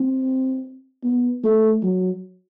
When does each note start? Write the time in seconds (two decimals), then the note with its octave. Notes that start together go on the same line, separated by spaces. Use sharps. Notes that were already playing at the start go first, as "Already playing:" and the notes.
Already playing: C4
1.03 B3
1.44 A3
1.83 F#3